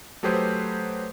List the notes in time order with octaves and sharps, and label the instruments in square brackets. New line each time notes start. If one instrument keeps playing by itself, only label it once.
[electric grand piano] F#3 A3 G4 G#4 B4 C5